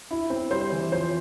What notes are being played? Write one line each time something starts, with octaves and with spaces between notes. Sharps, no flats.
E4
C4
G3 C5
E3
F3 C5